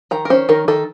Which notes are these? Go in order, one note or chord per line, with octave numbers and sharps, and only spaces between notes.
D#3 A#5
A#4
C#4 C5
D#3 A#4
D#3 A4